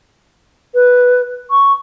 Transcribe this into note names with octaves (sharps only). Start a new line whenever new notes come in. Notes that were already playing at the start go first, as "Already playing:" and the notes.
B4
C#6